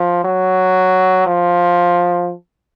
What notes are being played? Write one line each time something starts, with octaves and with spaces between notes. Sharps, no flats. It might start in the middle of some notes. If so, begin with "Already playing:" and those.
Already playing: F3
F#3
F3